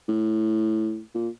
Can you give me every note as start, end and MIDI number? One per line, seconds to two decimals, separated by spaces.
0.09 1.01 45
1.15 1.29 46